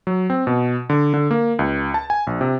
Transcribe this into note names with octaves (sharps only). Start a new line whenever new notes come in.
F#3
C4
B2
D3
D3
A#3
C#2
A5
G#5
A#1
C3